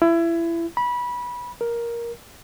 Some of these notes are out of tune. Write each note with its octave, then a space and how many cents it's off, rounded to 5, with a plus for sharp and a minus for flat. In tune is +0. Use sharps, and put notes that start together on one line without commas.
E4 +25
B5 -20
A#4 +10